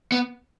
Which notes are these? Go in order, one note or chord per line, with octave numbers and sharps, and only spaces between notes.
B3